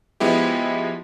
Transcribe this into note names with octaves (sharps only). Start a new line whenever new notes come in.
F3 G#3 B3 E4 G4